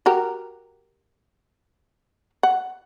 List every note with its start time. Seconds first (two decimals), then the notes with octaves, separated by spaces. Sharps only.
0.06 F#4 G4 A#4
2.43 F#5